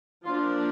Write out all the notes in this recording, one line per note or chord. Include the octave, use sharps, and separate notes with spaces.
F3 A#3 D4 F4